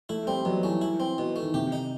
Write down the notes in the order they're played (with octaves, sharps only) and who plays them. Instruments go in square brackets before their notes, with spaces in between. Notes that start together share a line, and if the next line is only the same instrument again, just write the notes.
[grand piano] A3 [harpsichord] E4
[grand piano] G3 [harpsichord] C4
[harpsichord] B2 [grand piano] F#3
[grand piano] E3 [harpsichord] A3
[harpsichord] E4
C4
B2
A3
[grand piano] D#3
[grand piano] C3 [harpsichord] G4
[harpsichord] D#4